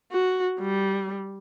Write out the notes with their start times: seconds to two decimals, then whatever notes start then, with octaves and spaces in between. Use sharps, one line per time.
0.12 F#4
0.60 G3